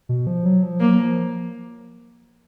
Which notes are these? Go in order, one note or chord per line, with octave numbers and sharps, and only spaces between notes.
B2
F3
F#3
F3
F#3 A#3
F3